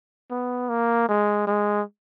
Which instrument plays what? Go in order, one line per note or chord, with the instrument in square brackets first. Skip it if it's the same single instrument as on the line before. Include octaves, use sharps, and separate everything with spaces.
[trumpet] B3
A#3
G#3
G#3